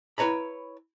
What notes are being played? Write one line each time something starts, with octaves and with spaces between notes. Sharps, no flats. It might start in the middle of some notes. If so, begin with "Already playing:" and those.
E4 B4 C#5 A#5 B5